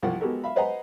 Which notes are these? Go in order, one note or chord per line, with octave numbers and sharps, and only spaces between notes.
C2 F3 F#5
G#3 B3 F#4 G4 A4 A#4
E5 F5 B5
B4 C5 D#5 F#5 G#5 A#5